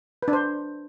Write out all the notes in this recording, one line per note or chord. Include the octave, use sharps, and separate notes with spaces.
B4
D4
C5